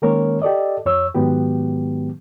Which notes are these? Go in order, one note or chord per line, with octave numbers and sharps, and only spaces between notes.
D#3 G#3 A#3 C#4 A#4 C#5
G4 A4 D5 D#5
F2 C#5 E6
G#2 D#3 F#3 G#3 B3 G4